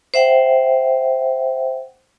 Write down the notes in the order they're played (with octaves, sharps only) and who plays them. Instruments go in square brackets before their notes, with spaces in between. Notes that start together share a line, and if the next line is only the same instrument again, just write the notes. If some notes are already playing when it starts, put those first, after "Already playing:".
[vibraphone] C5 E5 F#5 G5